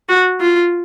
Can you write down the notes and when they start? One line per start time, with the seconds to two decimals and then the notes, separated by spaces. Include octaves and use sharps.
0.09 F#4
0.40 F4